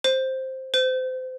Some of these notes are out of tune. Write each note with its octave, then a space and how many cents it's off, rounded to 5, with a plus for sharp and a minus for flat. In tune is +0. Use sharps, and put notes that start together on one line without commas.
C5 +5
C5 -30